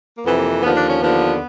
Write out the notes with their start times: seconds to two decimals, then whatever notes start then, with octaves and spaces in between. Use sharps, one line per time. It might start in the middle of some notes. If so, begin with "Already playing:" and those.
0.16 A#3
0.25 F2 C3 E3 B3
0.38 A#3
0.50 A#3
0.62 D#2 D3 F3 B3
0.76 D4
0.89 C#4
1.01 D#2 D3 F3 B3